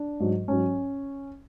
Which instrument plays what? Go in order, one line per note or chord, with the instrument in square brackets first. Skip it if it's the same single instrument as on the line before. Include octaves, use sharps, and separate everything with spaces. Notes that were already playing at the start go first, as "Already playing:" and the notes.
Already playing: [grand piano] D4
G#2 F#3
G#2 F#3 C#4